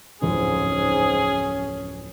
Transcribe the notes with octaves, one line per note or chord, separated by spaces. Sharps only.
D1 F2 G#2 C#4 G#4